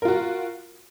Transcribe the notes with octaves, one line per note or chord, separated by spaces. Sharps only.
F4 F#4 A#4